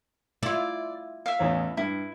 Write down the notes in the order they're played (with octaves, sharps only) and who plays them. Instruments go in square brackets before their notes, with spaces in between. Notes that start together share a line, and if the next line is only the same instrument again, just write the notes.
[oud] E4 F4 [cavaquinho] D5
[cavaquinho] E5 F5
[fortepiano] A1 E2 C#5
[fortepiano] G2 [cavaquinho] E4